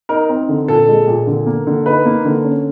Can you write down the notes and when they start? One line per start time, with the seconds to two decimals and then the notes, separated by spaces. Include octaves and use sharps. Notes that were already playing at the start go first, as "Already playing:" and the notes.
0.09 D#4 A#4
0.29 C4
0.49 D3
0.68 A#2 A4
0.88 G#3
1.07 A#2
1.27 D3
1.47 A#3
1.67 D3
1.86 D#4 B4
2.05 A#3
2.25 D3
2.45 C#4